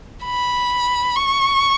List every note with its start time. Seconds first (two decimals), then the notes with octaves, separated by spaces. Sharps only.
0.25 B5
1.16 C#6